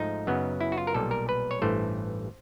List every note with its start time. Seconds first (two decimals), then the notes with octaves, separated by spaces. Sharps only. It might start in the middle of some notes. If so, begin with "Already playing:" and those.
Already playing: G#2 F3 A3 D#4
0.27 F#2 C#3 F#3 B3
0.61 E4
0.72 F#4
0.78 F4
0.87 A#4
0.94 B1 A#2 G3 A4
1.11 A#4
1.29 B4
1.51 C#5
1.62 A1 G2 E3 A3 C5